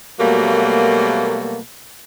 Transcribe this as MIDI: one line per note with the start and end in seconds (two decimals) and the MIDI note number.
0.19 1.57 47
0.19 1.57 54
0.19 1.57 55
0.19 1.57 57
0.19 1.57 58